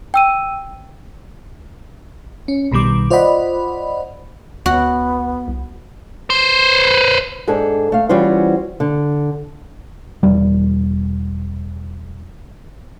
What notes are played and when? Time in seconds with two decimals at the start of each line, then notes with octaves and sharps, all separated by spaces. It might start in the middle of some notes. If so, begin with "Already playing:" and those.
0.14 G5 E6 D#7
2.48 C#4
2.71 B1 B2 D#3 G3 D6
3.10 F4 C5 D5 D#5 F#5 B5
4.66 D2 B3 F#4
5.48 C2
6.30 B4 C5
7.48 G#2 D4 G#4 A4 A5
7.92 A3 F5
8.09 E3 G3 C#4 F4 F#4 C5
8.80 D3
10.23 E1 G3